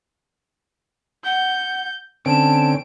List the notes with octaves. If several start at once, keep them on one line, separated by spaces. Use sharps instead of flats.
F#5 G6
D3 C4 C#4 A5 D7